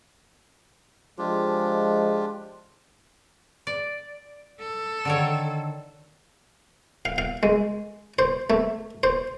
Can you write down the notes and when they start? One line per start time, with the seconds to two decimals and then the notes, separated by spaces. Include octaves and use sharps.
1.18 F3 G#3 D4 F4 G4
3.67 D5
4.60 A4
5.05 D3 D#3 C#5
7.05 F5
7.18 F5
7.43 G#3
8.19 C5
8.50 A3
9.03 C5